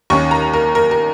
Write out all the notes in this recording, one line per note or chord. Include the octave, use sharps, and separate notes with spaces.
D#2 D#3 C#4 C#6
A#5
A#4
A#4
A#4